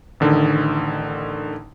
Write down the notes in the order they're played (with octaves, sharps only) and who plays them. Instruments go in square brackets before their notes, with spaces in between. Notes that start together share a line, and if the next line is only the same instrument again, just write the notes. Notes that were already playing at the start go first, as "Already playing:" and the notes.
[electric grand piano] A1 D3 D#3